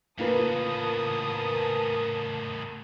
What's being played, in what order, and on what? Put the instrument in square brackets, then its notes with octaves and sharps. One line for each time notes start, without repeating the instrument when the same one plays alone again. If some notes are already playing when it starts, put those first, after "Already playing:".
[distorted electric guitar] A2 C#3 [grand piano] A#3 F4 B4 [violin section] A#4 A5 D#6